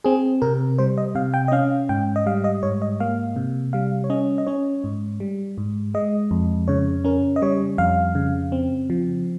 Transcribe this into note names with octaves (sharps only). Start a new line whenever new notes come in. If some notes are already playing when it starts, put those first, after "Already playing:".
C4 G#4
C3 A#4
G3 C5
D#5
C3 F5
G5
D#5
C#4 F5
G#2 G5
D#5
G3 F5
D#5
G#2 C#5
D#5
A#3 F5
C3
G3 F5
C#5
C#4 D#5
D#5
C#4 C#5
G#2
G3
G#2
G#3 D#5
F2
C#3 C#5
C#4 A#4
D#5
G3 C#5
F2 F5
C#3
C4
F3